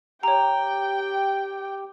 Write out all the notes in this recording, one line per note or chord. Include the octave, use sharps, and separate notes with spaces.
G4 C#5 G5 A#5